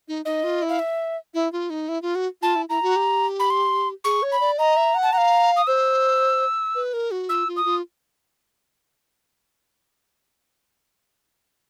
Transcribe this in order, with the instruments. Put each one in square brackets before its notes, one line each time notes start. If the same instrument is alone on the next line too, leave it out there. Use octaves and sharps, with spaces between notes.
[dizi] D#4
[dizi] D#4 [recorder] D#5
[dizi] F4
E4
[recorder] F5
E5
[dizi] E4
F4
D#4
E4
F4
F#4
[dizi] F4 [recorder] A5
[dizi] E4
[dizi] E4 [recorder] A#5
[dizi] F#4
G4
[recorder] B5
C6
[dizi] G#4 [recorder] C#6
[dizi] C#5
[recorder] B5
[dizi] D5
[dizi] D#5 [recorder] A#5
[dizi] E5
F#5
[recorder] A5
[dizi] F#5 [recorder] A#5
[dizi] F5
[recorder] D#6
[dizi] C5 [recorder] E6
[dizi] B4
A#4
F#4
[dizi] F4 [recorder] E6
[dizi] F4
[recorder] D#6
[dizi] F4